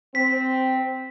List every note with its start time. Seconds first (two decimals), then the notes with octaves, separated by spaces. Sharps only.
0.15 C4 B6